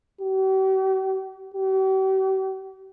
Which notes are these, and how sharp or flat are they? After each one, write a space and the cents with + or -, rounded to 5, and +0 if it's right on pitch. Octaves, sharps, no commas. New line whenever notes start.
G4 -45
G4 -45